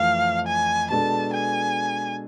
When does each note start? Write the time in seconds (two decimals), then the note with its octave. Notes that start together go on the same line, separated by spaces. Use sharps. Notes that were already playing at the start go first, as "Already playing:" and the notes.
Already playing: F2 E3 A3 C4 F5
0.47 G#5
0.90 B2 G#3 D4 A4 A5
1.33 G#5